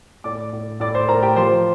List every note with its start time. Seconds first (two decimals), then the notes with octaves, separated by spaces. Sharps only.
0.24 A2 D5 D6
0.53 A2
0.80 A2 D5 D6
0.95 C5 C6
1.08 A2 A#4 A#5
1.22 G4 G5
1.36 F3 C5 C6